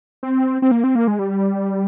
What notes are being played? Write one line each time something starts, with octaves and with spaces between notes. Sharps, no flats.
C4
C4
A#3
C4
A#3
G#3
G3